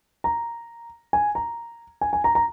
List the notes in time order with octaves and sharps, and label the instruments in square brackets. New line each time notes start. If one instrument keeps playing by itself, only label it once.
[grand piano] A#5
G#5
A#5
G#5
G#5
A#5
A#5